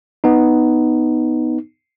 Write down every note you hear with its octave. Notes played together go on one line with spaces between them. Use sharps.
B3 D#4